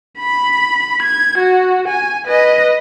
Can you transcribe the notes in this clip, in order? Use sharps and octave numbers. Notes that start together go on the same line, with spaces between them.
B5
G#6
F#4
G#5
B4 D#5